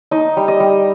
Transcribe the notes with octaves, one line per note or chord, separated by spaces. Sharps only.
D#4 D#5
G3
D#5
G3